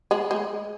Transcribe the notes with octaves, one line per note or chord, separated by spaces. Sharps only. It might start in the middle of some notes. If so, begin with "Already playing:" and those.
G#3
G#3